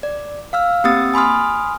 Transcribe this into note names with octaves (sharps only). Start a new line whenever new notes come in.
D5
F5 E6 F6
A#3 C4 G4 D#6 E6 A6
G#5 B5 C6 D#6 F6